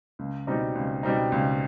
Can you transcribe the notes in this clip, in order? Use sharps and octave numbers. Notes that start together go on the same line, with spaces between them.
C#2
B2 G3 C4 D#4
C#2
B2 G3 C4 D#4
C#2